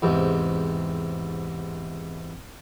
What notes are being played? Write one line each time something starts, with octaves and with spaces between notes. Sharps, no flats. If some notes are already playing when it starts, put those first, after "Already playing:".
E2 G#2 C3